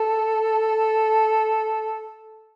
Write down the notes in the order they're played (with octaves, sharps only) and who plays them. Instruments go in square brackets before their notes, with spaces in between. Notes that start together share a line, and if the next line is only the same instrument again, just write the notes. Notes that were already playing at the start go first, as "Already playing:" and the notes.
Already playing: [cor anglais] A4